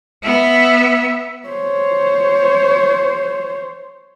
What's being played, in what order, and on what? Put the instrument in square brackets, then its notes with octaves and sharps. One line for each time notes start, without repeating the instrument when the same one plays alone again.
[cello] B3 E5
[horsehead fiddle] C5 C#5